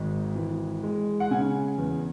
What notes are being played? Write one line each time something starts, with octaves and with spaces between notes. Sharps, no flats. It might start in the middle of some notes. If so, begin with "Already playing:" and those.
Already playing: G#1 G#2
E3
G#3
F#5
C#3 G#5
E2